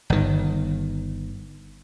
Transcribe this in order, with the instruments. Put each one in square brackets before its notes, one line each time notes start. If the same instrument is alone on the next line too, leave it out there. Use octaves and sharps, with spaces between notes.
[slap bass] G1 D#3